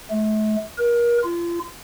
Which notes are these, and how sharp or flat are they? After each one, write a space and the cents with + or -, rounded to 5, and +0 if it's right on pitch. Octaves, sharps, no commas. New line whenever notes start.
A3 -40
A#4 +30
F4 -30